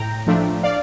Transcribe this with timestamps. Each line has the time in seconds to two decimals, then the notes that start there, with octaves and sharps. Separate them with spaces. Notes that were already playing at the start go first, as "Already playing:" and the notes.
Already playing: A2 G5 A#5
0.27 F3 A3 D4
0.63 D5 F5